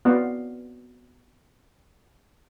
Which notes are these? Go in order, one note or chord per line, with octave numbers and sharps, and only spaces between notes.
B3 C4 F#4 D5 F5 A#5